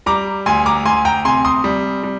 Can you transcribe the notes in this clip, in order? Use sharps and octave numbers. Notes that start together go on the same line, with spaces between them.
G3 A#5 D6
D2 G#5 C6
A#5 D6
D2 G#5 C6
G5 A#5
C3 G#5 C6
C6 D#6
G3
G3